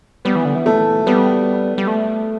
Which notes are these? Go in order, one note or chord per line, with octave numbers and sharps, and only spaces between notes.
G3 B3
E3
D3
E3
A3
G3 B3
G3
A3